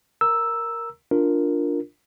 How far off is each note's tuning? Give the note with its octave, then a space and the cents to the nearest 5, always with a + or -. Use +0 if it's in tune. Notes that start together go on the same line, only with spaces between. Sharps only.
A#4 +0 A#5 +0 E6 +0
D4 +0 F4 +0 A#4 +0